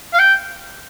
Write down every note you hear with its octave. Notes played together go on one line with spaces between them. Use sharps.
F5
G5